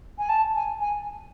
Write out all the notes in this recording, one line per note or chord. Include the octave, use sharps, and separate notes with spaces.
G#5
A5
G#5
G#5